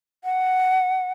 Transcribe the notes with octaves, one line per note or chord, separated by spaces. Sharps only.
F#5